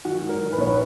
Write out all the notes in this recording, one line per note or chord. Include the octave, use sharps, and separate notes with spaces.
D#3 F#4
G#2
A#4
D#3
B4
A#1 C#5
B4